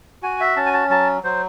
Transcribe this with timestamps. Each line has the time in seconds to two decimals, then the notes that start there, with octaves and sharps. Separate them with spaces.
0.23 F#4 G#5
0.41 E5
0.56 C#4 A5
0.66 G#5
0.73 A5
0.90 F#3 A5
1.23 F#3 C5